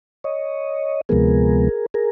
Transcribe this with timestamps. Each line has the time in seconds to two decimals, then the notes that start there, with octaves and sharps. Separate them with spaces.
0.24 C#5 D#5
1.09 D2 C3 F3 G#3 B3 G#4 A#4
1.94 G#4 A#4